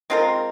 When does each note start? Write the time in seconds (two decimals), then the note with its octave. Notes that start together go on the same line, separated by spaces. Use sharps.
0.10 G#3 C4 F4 A#4